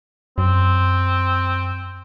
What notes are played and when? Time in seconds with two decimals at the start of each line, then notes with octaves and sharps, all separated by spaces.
0.38 F#2 C4